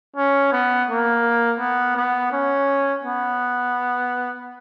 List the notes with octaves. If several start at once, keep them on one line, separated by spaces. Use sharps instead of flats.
C#4
B3
A#3
B3
B3
C#4
B3